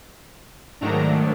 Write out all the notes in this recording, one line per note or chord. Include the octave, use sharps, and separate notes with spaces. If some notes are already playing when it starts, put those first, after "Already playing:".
G#2 D#3 F#3 A3 D4 A#5